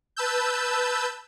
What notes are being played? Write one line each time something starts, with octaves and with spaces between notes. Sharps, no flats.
B4 A5 E6 G6